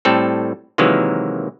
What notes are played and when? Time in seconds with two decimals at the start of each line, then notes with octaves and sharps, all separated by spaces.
0.05 A2 G3 C4 A4
0.78 C3 D#3 E3 F#3 G#3 A#3